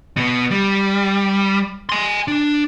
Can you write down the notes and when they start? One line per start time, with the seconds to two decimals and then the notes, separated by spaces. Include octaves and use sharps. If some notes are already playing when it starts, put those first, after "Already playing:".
0.17 B2 B3
0.51 G3
1.89 G#5 C6
2.28 D4